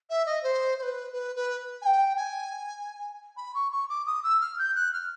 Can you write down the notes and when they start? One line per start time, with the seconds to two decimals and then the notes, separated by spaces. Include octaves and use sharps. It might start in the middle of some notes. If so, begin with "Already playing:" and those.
0.10 E5
0.26 D#5
0.43 C5
0.79 C5
0.82 B4
1.12 B4
1.35 B4
1.82 G#5
1.86 G5
2.16 G#5
3.37 B5
3.54 C#6
3.72 C#6
3.89 D6
4.06 D#6
4.23 E6
4.41 F6
4.59 G6
4.76 F#6
4.93 F6